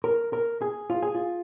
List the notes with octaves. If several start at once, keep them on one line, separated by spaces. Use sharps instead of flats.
A#4
A#4
G#4
F4
G#4
F4